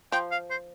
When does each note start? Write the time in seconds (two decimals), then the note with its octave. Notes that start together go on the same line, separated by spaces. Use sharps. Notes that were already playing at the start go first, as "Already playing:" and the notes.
0.12 F3 G5
0.31 F5
0.50 C5